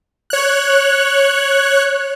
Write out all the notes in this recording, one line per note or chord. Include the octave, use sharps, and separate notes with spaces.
C#5 F#6